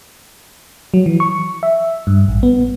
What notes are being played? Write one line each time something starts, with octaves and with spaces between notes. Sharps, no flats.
F#3
E3
C#6
E5
G2
A1
B3